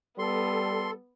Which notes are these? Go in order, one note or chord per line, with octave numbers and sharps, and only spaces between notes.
G3 B3 A4 C6